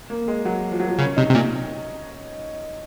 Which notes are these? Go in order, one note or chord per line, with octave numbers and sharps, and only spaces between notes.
A#3
G#3
F#3
F3
F#3
F3
C#3 C#4
C3 D#4
C3
A#2